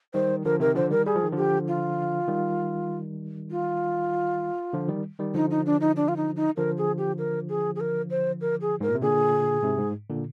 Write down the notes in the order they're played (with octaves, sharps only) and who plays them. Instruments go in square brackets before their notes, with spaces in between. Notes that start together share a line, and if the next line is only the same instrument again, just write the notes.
[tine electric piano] D#3 G3 [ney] C5
[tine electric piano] D3 F3 [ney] A#4
[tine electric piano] C3 D#3 [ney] A#4
[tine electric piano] D3 F3 [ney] C5
[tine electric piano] D#3 G3 [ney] A#4
[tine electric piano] G3 [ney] G#4
[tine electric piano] F3
D#3
[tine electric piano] D3 F3 [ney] G4
[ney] F4
[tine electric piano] D#3 G3
[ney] F4
[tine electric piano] D3 F3
D#3 G3
D#3 G3
[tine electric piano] D3 F3 [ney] D#4
[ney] D#4
D4
D#4
D4
F4
D#4
D#4
[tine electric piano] D3 F3 [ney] A#4
[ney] G#4
G4
A#4
G#4
G#4
A#4
C5
A#4
G#4
[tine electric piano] G#2 [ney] A#4
[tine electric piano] A#2
C3
[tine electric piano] A#2 D3 [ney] G#4
[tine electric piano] G#2 C3
G#2
A#2 D3